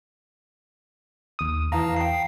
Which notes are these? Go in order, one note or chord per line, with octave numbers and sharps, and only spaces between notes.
D#2 D#6
E2 E3 F5 A5 A#5
G5 C7